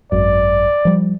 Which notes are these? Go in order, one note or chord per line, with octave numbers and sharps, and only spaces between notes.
G#1 F#2 D5
F3 G3